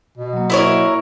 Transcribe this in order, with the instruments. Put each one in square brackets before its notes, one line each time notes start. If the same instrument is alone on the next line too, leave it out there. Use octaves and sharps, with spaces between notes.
[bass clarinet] B2
[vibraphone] F#3 A#3
[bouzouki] E4 A#4 C#5